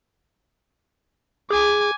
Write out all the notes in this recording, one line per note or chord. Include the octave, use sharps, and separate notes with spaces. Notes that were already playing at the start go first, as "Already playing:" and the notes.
G#4 G#5 D6